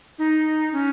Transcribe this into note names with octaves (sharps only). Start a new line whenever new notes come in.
D#4
C#4